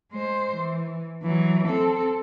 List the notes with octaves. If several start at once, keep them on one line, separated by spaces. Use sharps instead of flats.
G#3 C5
E3
E3 F#3
C4 A4